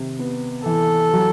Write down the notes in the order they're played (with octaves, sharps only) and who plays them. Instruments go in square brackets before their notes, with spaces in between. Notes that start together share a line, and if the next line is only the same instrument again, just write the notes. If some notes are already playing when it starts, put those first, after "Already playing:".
Already playing: [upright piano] C3 D#3
B3
[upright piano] E3 [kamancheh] A4
[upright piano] F#3